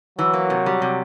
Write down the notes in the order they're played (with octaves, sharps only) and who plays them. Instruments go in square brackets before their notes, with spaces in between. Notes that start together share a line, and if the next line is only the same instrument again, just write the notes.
[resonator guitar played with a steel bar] E3 [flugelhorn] F#3
[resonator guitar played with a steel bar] A#3
C3
G3
C3